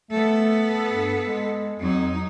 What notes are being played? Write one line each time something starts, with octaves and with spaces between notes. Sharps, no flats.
A3 B3 A4
G2
G#3
F2 F#3 D#4